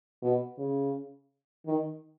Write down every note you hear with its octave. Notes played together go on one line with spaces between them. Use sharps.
B2
C#3
D#3